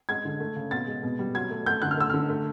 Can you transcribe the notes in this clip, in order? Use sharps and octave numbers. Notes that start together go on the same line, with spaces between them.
G#3 G#6
D3
A3
C#3
B2 A6
G#3
B2
G3
F#3 G#6
A3
A3 G6
D3 F#6
F6
A3 E6
D3 F6
A3